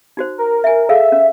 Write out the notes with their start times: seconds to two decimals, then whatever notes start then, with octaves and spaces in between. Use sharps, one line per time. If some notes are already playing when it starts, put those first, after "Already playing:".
0.17 D#4 F#4 C5
0.38 A#4
0.64 E5 G#5
0.89 G#4 A4 E5 F5
1.12 C#4 E5